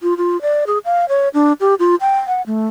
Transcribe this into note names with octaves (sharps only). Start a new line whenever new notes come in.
F4
F4
D5
G#4
F5
C#5
D4
G4
F4
G5
F#5
A3